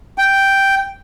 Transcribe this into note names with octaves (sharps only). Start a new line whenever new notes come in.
G5